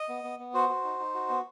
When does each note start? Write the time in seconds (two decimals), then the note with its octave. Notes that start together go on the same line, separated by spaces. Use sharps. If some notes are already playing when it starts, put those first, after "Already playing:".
Already playing: D#5
0.09 B3
0.24 B3
0.39 B3
0.54 F#4 C5
0.69 F#4
0.84 D#4
0.99 D#4
1.14 F#4
1.29 B3